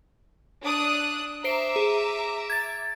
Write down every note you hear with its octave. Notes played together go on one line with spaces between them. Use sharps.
D4 D#6 F#6
C5 E5 A#5 D6 C7 D7
G#4
G#6 A6